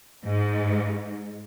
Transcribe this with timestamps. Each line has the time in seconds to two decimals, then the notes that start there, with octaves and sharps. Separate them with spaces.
0.25 G#2